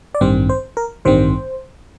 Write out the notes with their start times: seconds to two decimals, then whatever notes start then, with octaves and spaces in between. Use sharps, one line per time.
0.15 D5
0.21 A1 G2 D#3 G3 C4 C5
0.50 C5
0.77 A#4
1.05 A1 G2 D#3 G3 C4 C5